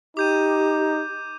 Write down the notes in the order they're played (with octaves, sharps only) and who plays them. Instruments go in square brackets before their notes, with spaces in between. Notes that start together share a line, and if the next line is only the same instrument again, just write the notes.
[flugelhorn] D#4 [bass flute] G4 [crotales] D6 G6 D#7